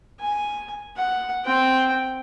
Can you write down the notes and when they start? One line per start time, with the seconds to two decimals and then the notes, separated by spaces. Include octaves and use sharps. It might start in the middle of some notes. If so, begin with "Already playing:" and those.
0.20 G#5
0.97 F#5
1.45 C4 G5